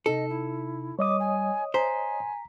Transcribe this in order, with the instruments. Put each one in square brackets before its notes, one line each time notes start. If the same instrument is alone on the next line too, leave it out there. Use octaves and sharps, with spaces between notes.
[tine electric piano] C3 D#4 [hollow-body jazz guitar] A4 [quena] D#5
[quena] E4
[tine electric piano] G3 [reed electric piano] C#5 D#5 D#6 [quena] D6
[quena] G#5
[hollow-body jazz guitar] C5 [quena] G#5 [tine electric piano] A#5 B6